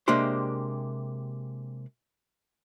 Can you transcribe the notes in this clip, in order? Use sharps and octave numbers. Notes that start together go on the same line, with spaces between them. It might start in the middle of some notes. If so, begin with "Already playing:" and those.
C3 G#3 A#3 D4 G4 C5